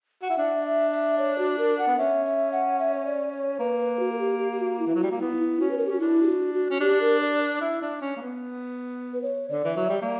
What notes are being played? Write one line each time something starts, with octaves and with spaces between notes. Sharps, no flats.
F#4
E4 F#5
D4 E5
E5
E5
C#5
F#4
A#4
F#5
B3
C#4 E5
E5
F#5
E5
C#5
D5
C#5
A#3 B4
B4
F#4
A#4
G4
G4
G4
F#4
E4
E3
F#3
G3 F#4
A#3
B3 E4
E4
C#4 F#4
B4
A#4
G4
C#4 F#4
D4 E4
G4
F#4
F#4
C#4
D4 G4
A#4
D5
E4
D4
C#4
A#3
B3
B4
C#5
D3 D5
E3
F#3 E5
G3
A#3 D5